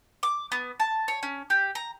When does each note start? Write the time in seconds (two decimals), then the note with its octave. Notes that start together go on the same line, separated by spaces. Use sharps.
0.23 D6
0.52 B3
0.80 A5
1.08 C#5
1.23 C#4
1.50 G4
1.75 A#5